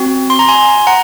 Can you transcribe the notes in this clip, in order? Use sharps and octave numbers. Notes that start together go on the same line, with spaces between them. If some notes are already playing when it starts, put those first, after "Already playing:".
Already playing: C4 F#4
C6
A#5
G#5 C6
F#5 A#5